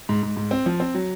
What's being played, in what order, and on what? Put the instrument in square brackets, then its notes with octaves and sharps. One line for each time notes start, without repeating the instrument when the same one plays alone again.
[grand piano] G#2
G#2
G#2
C4
F3
C4
F#3